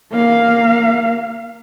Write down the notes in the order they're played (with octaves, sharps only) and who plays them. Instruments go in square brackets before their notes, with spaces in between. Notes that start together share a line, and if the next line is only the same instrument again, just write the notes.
[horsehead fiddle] A#3 F5